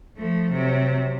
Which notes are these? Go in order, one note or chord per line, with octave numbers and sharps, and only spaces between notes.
F3 A3
C3 F#3